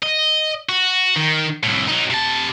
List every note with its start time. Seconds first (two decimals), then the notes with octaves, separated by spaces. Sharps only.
0.03 D#5
0.69 F#4
1.16 D#3
1.63 C2 A2
1.88 F#3 D#4
2.10 C3 A5